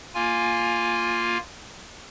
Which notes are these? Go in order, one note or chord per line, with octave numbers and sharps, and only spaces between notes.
A#3 F4 G#5